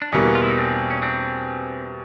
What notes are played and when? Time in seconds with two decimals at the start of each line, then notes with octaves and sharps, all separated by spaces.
0.02 D4
0.12 E2 B2 G3 A#3 B3 C#4
0.35 F4
0.43 E4
0.50 D#4
0.57 C4 D4
0.90 C#4
1.02 C4 D4